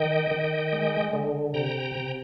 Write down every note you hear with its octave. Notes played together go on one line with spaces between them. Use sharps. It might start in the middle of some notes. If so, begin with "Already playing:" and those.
Already playing: D#3 D#5 G5
D#3
G#3
D3
C3 G5 A#5
C3